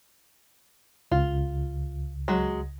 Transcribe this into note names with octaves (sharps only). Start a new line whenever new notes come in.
C#2 F4
F#3 G#3